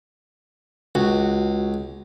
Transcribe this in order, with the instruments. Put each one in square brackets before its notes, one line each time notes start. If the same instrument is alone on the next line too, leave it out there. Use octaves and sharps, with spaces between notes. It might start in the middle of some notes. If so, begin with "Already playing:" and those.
[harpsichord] C#2 [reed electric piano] F#4